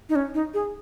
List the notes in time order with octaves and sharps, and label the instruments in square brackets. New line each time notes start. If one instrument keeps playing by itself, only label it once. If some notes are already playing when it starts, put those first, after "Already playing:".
[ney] D#4
C#4
D#4
G#4